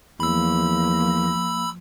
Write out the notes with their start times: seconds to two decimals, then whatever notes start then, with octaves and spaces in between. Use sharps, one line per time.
0.20 E2 F3 A#3 B5 E6